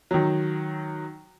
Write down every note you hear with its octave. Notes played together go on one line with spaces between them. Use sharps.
D#3 F#3